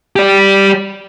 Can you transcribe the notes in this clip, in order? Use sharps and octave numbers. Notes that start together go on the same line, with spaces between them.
G4 D5